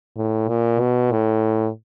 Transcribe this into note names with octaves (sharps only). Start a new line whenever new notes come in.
A2
A#2
B2
A2